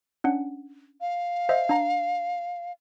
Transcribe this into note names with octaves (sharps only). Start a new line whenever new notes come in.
C#4 D4 F#5
F5
C5 D#5 E5
D4 A#5